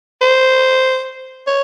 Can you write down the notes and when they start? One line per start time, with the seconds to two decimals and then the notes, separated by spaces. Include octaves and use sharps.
0.21 C5
1.47 C#5